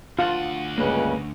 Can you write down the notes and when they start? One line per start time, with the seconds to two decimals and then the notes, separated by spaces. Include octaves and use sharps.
0.19 D2 F4 F5 F#5 A5
0.78 C#2 G2 C#3 A#3 B4